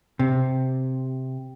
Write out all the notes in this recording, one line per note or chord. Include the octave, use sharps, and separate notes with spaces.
C3